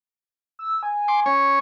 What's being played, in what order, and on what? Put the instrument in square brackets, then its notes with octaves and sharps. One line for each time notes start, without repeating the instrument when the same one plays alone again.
[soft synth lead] E6
G#5
[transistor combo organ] C6 D6
C#4 C#5